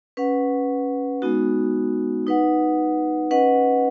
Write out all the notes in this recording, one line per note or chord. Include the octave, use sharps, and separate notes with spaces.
C#4 B4 F#5
G#3 B3 D#4 F#4
D#4 B4 F#5
C#4 B4 D#5 F#5